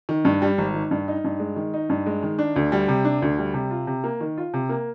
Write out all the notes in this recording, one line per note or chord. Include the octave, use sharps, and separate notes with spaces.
D#3
G2
G3
G#1
D#3
G2
D#4
G2
G#3
D#3
D#4
G2
G#3
D#3
D4
D2
G3
C3
D4
D2
G3
C3
F4
C3
A#3
D#3
F4
C3
A#3